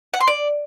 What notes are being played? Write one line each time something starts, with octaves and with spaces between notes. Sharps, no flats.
F#5
C6
D5